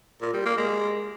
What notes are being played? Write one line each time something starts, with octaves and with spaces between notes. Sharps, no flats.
A#2
G3
A#3
G#3